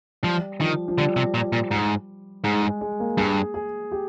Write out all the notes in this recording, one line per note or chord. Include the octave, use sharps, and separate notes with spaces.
F3 G3
D#3 F3
F3
D3 G3
C3
A#2
A#2
G#2
G#2 G#3
G#3
G#3
A#3
G2 G#4
G#4
G4